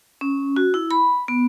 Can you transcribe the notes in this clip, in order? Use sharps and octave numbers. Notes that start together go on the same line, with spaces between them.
C#4
F#4
E4
B5
B3